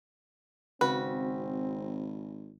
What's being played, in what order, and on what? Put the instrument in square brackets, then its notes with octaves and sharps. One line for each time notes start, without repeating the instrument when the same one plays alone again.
[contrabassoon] G#1 [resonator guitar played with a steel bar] C#3 F#4 [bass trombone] C4 [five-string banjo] B4